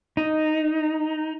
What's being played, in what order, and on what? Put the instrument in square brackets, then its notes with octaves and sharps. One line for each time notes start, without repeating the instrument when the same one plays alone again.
[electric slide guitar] D#4